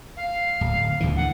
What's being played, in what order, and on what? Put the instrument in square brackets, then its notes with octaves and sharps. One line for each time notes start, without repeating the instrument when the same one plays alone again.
[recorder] F5
[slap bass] D1
D2 D3 E3
[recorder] F#5